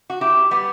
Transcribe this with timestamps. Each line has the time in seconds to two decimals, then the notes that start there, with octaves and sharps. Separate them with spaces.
0.10 F#4
0.21 E4 G4
0.51 G3 B3